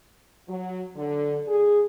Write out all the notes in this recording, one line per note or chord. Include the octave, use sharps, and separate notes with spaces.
F#3
D3
G#4